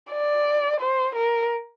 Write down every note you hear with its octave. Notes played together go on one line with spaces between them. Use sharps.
D5
C5
A#4